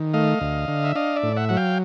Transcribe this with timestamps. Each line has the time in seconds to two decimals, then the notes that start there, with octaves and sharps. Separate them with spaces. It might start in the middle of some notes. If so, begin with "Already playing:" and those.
Already playing: D#3
0.14 A3 D#5 F5
0.41 D2
0.68 D3
0.84 E5
0.95 D4 D#5 F5
1.16 D5 E5
1.23 A2
1.36 E5 F#5
1.49 F#3 F#5
1.57 F5 G5